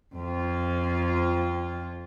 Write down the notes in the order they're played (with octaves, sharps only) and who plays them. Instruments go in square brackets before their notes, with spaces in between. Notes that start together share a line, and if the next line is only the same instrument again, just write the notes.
[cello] F2 F4